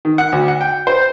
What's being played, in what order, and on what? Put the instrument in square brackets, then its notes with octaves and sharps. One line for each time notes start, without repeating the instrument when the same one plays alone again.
[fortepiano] D#3
F#5
D2
F#5
G5
C5